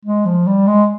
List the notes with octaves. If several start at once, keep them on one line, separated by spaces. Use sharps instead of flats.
G#3
F3
G3
G#3